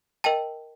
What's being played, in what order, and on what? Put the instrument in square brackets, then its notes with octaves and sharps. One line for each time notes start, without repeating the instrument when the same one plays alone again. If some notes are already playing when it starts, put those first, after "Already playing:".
[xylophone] A#4 D#5 G5 A5